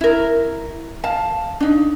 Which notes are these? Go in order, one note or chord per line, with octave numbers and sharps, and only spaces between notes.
E4 A#4
F5 A5
D4 D#4